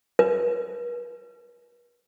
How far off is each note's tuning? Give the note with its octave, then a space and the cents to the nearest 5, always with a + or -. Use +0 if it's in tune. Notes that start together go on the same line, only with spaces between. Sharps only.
B4 -45